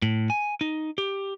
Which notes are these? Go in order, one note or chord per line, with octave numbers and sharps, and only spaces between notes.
A2
G#5
D#4
G4